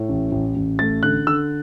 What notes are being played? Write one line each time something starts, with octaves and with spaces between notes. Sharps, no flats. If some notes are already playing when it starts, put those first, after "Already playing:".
Already playing: A2
A1
A1
A1
A3 A6
D3 F#6
D3 E6